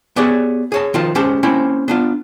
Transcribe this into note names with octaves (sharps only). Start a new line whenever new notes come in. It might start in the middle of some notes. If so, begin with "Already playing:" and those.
B3 G4 G#4 C#5 D5 E5
G#4 C#5 A5
D#3 F3 F4 A#4 A5
G#3 C#4 G4 C5 A5
A#3 C4 C#4 E4
B3 D4 F4